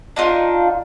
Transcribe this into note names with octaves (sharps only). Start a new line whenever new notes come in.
D4 D#4 F4